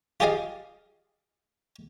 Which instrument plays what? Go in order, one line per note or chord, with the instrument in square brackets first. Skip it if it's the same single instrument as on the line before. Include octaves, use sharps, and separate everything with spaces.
[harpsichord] F4 G4 G#4 D5 D#5 F5